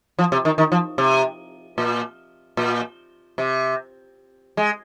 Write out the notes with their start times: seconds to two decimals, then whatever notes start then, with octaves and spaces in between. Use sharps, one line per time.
0.19 F3
0.32 C3
0.45 D#3
0.58 D#3
0.72 F3
0.98 C3
1.78 A#2
2.57 A#2
3.38 C3
4.57 G#3